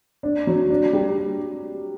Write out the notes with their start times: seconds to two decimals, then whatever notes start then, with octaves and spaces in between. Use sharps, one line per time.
0.23 D4
0.47 F#3
0.70 D4
0.93 G3